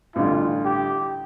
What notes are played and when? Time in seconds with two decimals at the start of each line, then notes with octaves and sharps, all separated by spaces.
0.15 A1 G2 D3 F4
0.65 G4